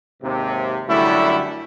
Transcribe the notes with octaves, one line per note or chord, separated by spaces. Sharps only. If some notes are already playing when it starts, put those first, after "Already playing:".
D#2 G#2 C3
F#2 D3 G3 A3 E4